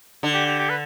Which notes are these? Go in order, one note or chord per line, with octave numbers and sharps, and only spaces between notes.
D3
G4
G4
G4
B4